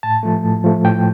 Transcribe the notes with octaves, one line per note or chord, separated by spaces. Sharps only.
A2 A5
F3 A3
A2
F3 A3
A2 G5